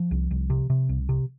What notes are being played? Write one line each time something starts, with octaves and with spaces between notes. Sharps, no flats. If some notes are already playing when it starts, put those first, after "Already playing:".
Already playing: F3
C2
C2
C3
C3
C2
C3